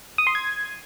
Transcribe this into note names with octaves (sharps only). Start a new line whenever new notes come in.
D#6
C6
G#6